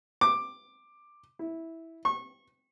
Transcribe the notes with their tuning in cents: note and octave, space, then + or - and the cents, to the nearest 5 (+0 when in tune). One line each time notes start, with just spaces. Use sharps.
D6 +10
E4 -10
C#6 -30